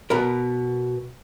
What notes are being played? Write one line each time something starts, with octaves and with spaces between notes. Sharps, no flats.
B2 B3 A#4